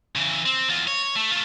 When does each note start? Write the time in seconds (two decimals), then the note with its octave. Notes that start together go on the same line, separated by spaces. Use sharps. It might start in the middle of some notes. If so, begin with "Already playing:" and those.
0.15 C#3 E3
0.46 C4
0.69 E2 F4
0.87 C#5
1.16 A3
1.31 A3 F4